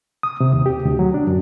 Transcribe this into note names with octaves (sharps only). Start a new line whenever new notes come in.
D#6
C3
D#2
G4
D2
F#3
D4
F#2